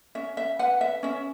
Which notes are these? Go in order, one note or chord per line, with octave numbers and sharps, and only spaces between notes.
C#4 E5
E5
B4 F#5
E5
C#4 E5